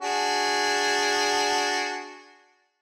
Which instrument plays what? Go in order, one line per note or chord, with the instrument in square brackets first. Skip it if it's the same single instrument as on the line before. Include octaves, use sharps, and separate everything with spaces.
[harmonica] D4 F#4 G#4